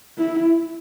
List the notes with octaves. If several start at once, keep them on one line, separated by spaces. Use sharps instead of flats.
E4